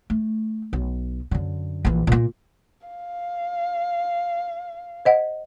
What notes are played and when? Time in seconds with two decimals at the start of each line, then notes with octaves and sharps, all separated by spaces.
0.10 A3
0.73 B1
1.31 F#2 D3
1.85 A#1 E3
2.07 A#2 A#3
2.87 F5
5.05 C5 D#5 F#5